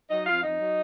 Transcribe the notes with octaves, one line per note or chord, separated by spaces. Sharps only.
F#3 D#4 D#5
F2 F4 F5
F2 D#4 D#5
F#3